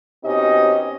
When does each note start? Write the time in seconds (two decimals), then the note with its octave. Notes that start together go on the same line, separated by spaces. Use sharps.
0.24 B2 C4 C#4 D#4 G4 D#5